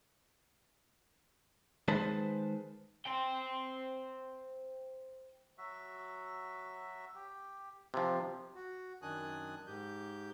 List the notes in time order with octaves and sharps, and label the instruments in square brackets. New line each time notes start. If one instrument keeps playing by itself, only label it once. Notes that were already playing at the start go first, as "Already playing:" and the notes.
[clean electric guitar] D#3 G#3 B4 C5 A5
[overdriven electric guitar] C5 G5
[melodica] F#3 F#4 E5
G4
[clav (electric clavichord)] C3 F3 [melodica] G4 F5
[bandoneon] F#4
F#2 D#3 D4 G#5 D#6 F#6
G#2 G4 G6